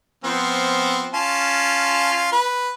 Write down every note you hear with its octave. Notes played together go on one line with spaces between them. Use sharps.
F3 B3 C4
C#4 F4 A5
B4